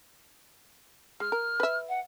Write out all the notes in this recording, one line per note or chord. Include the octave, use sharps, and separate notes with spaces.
G#3 F6
A#4
B4 E5
F#5